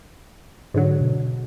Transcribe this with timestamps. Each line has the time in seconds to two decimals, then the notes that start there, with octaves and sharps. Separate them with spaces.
0.74 G#2 D3 F#3
1.01 B2